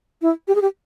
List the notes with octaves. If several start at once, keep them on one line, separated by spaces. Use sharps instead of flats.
E4
G4
G#4
G4